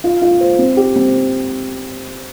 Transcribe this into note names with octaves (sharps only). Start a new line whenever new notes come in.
F4
F4
C5
C4
G4
C4